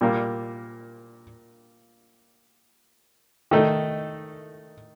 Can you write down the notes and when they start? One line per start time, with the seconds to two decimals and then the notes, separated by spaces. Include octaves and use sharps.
0.01 A#2 G3 A#3
3.51 D#3 A3 D#4